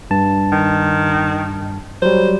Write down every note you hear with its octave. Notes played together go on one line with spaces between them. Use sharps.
G2 A5
D#3
F#3 G3 C5